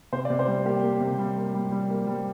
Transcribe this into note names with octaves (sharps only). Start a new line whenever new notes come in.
C3 C5
D5
C3
C5
G3
A#3 G4
A#3
C3
G3
A#3
G3
G3
A#3
G3